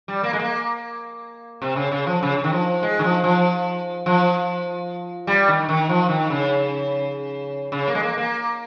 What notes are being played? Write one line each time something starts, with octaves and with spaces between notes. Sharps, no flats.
G3
A#3
G#3
A#3
C3
C#3
C#3
F3
C#3
C#3
D#3
F3
G#3
D#3
F3
F3
F3
G3
D#3
D#3
F3
D#3
C#3
C#3
A#3
G#3
A#3
A#3